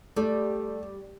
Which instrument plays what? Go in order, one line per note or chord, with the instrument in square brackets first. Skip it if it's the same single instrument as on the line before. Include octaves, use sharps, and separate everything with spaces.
[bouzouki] G3 [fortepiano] A3